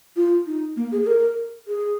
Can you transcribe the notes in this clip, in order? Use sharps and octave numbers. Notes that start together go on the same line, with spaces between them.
F4
D#4
A#3
G#4
G#4
A#4
G#4